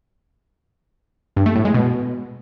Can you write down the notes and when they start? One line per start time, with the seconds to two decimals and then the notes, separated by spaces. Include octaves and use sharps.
1.37 G2
1.46 A3
1.55 A2
1.65 G#3
1.74 B2